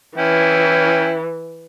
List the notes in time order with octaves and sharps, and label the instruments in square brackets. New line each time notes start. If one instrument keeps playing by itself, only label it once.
[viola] E3 [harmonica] C#4 E4 G5